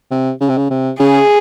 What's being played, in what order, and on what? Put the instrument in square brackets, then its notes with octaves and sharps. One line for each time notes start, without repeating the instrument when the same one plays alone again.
[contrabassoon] C3
C#3
C3
C#3
C3
[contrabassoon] C#3 [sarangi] G#4